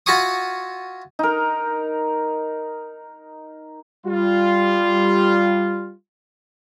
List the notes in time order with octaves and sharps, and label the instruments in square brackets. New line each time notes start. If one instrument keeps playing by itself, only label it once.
[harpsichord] F4 F#4 E5 G#5 C#6 D#6
[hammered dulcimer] D#4 A#4
[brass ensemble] G3 F4